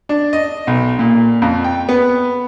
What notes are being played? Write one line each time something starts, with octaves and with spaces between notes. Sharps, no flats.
D4
D#5
B1
A#2
F2
G5
B3